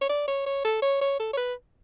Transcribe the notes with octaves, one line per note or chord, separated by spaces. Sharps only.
C#5
D5
C#5
C#5
A4
C#5
C#5
A4
C#5
B4